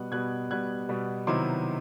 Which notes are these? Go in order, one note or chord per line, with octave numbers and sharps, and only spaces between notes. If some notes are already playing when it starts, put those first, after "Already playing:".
Already playing: B2 G3 B3 F#6
B2 G3 B3 F#6 G#6
B2 G3 B3 F#6 G#6
B2 G3 B3
C3 D#3 F#3 B3 E4 C6 D6